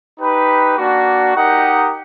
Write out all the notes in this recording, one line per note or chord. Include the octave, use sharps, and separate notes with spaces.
D#4 G4 B4
A#3 D4 F#4
D#4 G4 A#4 D#5 F#5